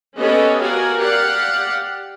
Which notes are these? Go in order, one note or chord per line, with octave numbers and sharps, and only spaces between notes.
B3 C#4 G4 A4 C#5 D#5
F#4 A#4 D5 F5 G#5
G4 D5 F5 F#5